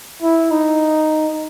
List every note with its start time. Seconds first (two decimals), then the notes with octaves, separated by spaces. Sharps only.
0.22 E4
0.51 D#4